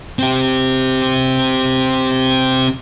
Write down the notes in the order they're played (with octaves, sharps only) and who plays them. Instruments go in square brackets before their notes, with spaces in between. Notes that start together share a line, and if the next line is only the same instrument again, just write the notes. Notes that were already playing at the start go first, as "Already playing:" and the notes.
[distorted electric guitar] C4 G4